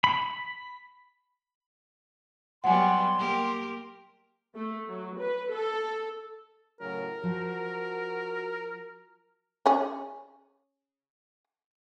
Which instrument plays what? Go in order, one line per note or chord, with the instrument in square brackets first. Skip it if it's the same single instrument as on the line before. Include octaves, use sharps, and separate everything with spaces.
[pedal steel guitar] B5
[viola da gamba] F#3 G3 B3 [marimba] F#5 G#5 [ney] C6
[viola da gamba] A#3 G4 A#4
[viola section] A3
F#3
B4
A4
[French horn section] A2 C#3 F#3 [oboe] A#4
[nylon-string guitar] F3 [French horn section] F#4
[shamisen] C#4 G#4